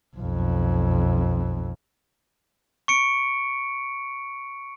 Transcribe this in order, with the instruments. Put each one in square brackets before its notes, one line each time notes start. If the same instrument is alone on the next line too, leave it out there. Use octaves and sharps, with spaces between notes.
[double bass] B1 F2
[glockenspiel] C#6 C#7 D7